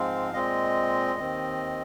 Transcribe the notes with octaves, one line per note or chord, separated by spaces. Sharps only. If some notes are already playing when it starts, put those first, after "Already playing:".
Already playing: G#2 F3 G#3 C4 F5
A#2 G#3 C4 D#5
D#2 D#3 C4